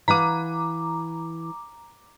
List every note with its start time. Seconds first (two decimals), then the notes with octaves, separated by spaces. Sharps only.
0.08 E3 F5 F#5 A#5 D6